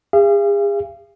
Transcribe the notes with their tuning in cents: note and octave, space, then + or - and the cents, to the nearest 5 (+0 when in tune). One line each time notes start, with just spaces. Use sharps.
G#4 -40 F5 -40